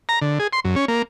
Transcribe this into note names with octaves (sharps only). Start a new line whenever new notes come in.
A#5
D3
G#4
C6
F#2
C#4
A#3